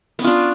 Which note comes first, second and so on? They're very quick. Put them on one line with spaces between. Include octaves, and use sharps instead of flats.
B3 C#4 F4 D4